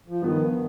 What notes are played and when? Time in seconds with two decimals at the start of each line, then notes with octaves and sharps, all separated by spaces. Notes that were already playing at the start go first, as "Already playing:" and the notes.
0.08 F3
0.22 G2 D#3 F3 B3